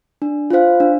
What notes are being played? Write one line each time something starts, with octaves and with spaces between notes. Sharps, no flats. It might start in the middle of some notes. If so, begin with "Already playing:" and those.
D4
F4 C5 F5
D4